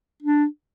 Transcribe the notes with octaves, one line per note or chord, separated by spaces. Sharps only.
D4